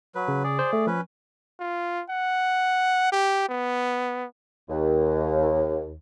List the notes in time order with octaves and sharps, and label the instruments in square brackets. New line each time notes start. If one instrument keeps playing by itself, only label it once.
[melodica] F#3 B4
[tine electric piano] C#3
[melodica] G#4 D5
[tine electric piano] C5
A3
[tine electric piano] F3 [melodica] C#4 B4
[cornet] F4
F#5
G4
B3
[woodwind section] D#2